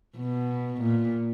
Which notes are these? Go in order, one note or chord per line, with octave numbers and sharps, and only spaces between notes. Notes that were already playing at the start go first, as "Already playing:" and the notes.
B2
A#2